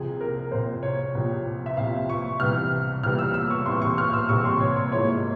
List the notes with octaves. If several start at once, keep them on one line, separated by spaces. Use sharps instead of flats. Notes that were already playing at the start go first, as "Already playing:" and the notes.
Already playing: C2 C3 F3 G#4
A#4
C2 C3 F3 C5
C#5
C2 C3 F3
E5
C2 C3 F3 F5
C#6
C2 C3 E3 G3 F6
C2 C3 E3 G3 F6
E6
E6
C#6
C2 C3 E3 G3 C6
C#6
F6
E6
C2 C3 E3 G3 C#6
C6
C#5
C#5
G#2 F3 A#3 E4 C#5